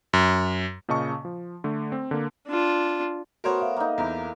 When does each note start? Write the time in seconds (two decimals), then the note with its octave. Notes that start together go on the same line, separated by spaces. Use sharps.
0.13 F#2
0.89 A#2 C#3 D#5 A5 C#6
1.25 F3
1.64 D3 A3
1.92 C4
2.11 D3 A#3
2.48 D4 F4
3.44 A3 B3 F#4 A#4 C5 C#5 C6
3.61 E5 F5
3.77 A#3 D#4
3.98 E2 E4 A#4